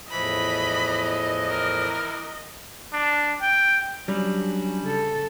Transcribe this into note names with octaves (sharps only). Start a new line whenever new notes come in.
E2 A2 E3 F3 D#5 B5
A#4
D4
G5
F#3 G3 C#4 D4
C#3 A4